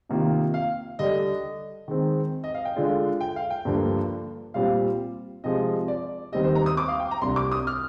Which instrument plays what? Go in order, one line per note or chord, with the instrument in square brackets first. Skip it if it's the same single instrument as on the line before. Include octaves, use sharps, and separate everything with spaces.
[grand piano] C3 D#3 A#3 F4
[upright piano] F5
[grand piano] D3 G3 D4 G4 D5 [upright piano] D#5
[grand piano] D#3 G#3 C4
[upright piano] D#5
F5
G5
[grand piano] D3 G#3 D4 F4
[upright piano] G5
F5
G5
[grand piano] G2 D3 F3 A#3
[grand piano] A#2 G3 C4 F4 [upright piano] F5
[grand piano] C3 F3 G#3 [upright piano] D#5
[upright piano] D5
[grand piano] D#2 D#3 G3 C4 G4 [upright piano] D#5
[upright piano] C5
A#5
D#6
D6
F5
G5
A#5
[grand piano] C2 C3 G3 D4 [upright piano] C6
[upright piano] D6
D#6
F6